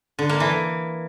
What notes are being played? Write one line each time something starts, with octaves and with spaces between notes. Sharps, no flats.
D3
A#3
E3